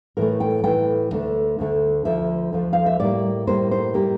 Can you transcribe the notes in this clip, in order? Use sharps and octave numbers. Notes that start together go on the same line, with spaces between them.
A2 E3 A3 A#4
G5
A2 E3 A3 G5
D2 D3 A3
D2 D3 A3
D2 D3 F3 E5
D2 D3 F3
F5
E5
A2 G3 A#3 D5
A2 G3 A#3 C5
C5
A2 G3 A#3 G4